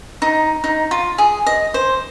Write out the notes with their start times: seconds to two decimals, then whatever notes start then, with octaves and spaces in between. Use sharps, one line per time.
0.22 D#4
0.64 D#4
0.91 F4
1.18 G#4
1.46 D#5
1.74 C5